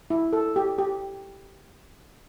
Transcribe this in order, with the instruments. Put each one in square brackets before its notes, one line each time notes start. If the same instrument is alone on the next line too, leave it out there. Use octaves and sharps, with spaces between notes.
[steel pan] E4
A4
G4
G4